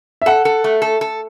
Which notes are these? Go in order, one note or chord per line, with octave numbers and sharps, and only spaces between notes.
E5
A4 F#5
A4
A3
A4
A4